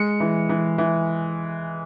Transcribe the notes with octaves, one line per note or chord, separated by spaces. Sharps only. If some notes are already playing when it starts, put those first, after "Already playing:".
Already playing: G#3 C#7
E3
E3
E3